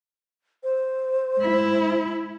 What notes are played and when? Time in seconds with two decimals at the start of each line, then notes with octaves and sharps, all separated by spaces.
0.63 C5
1.38 G#3 E4